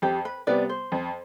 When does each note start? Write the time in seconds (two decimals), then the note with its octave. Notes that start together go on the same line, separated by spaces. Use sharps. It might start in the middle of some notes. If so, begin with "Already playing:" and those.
0.02 F2 G4
0.25 B4
0.47 C3 G3 B3 B4 D5
0.69 C5
0.92 F2